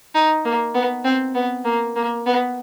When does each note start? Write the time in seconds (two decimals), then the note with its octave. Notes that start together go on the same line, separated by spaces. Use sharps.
0.15 D#4
0.45 A#3
0.74 B3
1.04 C4
1.35 B3
1.65 A#3
1.96 A#3
2.26 B3